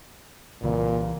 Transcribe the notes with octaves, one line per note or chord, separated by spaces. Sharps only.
C2 A#2 C#3 E3